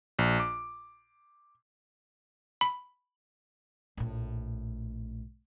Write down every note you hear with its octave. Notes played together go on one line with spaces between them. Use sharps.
A#1
D6
B5
A#1 A2